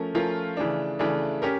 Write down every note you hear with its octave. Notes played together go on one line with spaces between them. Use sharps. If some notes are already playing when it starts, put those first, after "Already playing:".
Already playing: F3 A3 C#4 A#4
F3 A3 C#4 F4 A#4
C#3 E3 A3 D4
C#3 E3 A3 D4
C#4 G4 A#4